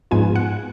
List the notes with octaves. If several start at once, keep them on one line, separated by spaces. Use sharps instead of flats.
G#2 F3 G#3 B3 F4 G#5
F#5